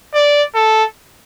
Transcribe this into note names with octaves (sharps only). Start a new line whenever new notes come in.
D5
A4